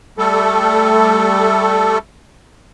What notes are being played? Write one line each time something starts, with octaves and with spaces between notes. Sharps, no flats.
G3 A3 A4